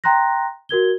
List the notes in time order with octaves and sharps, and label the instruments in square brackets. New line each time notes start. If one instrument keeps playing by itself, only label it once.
[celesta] G5 A#5 C6 F#6 A#6
F#4 A#4 G#6 G7